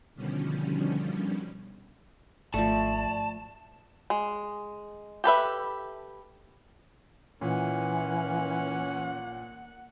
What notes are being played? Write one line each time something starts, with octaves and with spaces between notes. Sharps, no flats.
B2 D3 D#3 F3 G3 C#4
G#1 F3 A3 D5 A5
G#3
G4 A4 B4 E5
A#2 E3 A#3 C#4 F#5